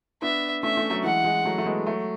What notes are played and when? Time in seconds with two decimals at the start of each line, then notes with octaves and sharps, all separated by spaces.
0.22 B3 D4 E5
0.63 A3 C#4 E5
0.77 A3 C#4
0.90 F#3 A3
1.03 E3 G#3 F#5
1.24 E3 G#3
1.45 F#3 A3
1.58 A3
1.66 G#3 B3
1.86 F#3 A3